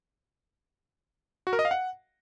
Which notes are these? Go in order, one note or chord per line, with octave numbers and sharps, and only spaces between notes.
F#4
A#4
D#5
F5
F#5